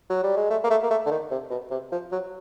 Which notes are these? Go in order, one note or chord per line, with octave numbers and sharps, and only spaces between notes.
F#3
G3
G#3
A3
A#3
A3
A#3
A3
D3
D#3
C3
B2
C3
F3
F#3